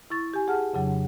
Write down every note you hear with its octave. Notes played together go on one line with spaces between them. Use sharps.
E4 C#6 A6
G4 G#5
G#4 F#5 A5 F6
F2 C#3 F#3 D4